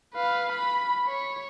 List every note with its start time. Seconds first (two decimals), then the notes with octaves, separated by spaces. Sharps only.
0.15 B4 F5
0.52 B5
1.07 C#5